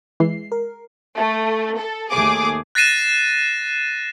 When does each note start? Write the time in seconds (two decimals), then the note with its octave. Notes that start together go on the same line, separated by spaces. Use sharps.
0.20 E3 G#3 C7
0.52 A#4
1.14 A3
1.77 A4
2.10 D#2 A3 G#4 D6
2.75 F#6 A6 A#6 C7 D#7 E7